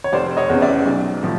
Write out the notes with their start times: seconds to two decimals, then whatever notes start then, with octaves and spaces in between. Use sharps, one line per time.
0.04 C#5
0.12 F1 C5 D5
0.37 C#5 D#5
0.50 E2 C#3
0.62 D5 E5
0.86 B1
1.23 A2 F3